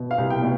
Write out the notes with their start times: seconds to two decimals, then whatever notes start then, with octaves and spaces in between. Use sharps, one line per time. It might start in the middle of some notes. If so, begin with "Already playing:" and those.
Already playing: B2
0.11 F5
0.18 C2
0.30 G5
0.43 B2